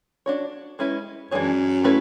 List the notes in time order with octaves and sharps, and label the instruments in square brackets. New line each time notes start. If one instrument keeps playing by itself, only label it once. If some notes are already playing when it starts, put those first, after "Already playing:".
[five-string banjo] D4 F#4 C#5
G#3 C#4 E4 B4
[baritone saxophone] F#2 [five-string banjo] E3 G#3 D4 G#4 C#5
[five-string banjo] A3 C#4 E4 B4